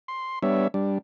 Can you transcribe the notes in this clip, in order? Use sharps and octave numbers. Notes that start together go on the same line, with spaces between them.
C6
G3 B3 D4 C#5 E5
G3 D4